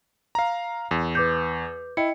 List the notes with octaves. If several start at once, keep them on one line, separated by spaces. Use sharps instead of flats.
F5 A#5
E2
B4 D6 G6
E4 D#5 G5 C#7